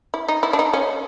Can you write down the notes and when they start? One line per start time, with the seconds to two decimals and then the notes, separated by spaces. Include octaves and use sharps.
0.14 E4
0.28 D#4
0.43 E4
0.53 D4
0.59 D#4
0.73 C#4